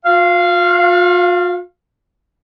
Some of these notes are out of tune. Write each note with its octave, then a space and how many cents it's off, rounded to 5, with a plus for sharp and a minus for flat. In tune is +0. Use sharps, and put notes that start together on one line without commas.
F4 +40 F5 -15